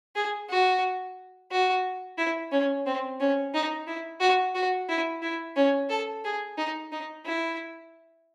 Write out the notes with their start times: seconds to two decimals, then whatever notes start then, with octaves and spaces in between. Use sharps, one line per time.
0.15 G#4
0.50 F#4
1.51 F#4
2.18 E4
2.52 C#4
2.86 C4
3.20 C#4
3.54 D#4
3.87 E4
4.21 F#4
4.55 F#4
4.89 E4
5.22 E4
5.56 C#4
5.90 A4
6.24 G#4
6.58 D#4
6.92 D#4
7.26 E4